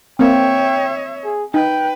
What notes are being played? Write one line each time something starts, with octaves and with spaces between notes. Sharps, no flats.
A#3 C4 C#5 E5 G5
G#4
D#4 B4 G5